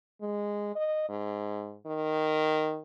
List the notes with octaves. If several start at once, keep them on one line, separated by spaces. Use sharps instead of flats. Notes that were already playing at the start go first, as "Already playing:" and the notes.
G#3
D#5
G#2
D#3